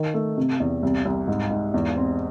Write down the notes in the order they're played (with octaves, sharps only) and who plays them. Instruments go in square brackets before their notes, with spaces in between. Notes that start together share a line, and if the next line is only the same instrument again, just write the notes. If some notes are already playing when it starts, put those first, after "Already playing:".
Already playing: [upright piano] D#3
A3
C3
E2
C2
C2
G#2
G#2
E2
C4